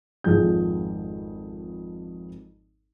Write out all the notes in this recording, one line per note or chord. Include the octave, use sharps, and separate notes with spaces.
G#1 F2 F3 G#4 G6